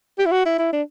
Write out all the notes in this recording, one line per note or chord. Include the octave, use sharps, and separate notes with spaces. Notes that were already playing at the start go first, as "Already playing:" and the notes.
G4
E4
F#4
E4
E4
D4